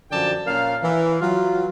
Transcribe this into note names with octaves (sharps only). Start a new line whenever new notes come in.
F#2 D3 F3 D5 G5 A5
A#2 C#4 A#4 F5
E3
F#3 F4